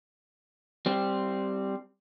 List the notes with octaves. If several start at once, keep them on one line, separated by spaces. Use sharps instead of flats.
G3 C4